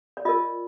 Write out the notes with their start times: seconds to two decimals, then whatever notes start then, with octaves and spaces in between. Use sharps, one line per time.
0.17 D5
0.25 F4 A#4 D#5